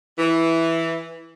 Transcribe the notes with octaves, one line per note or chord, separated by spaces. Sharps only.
E3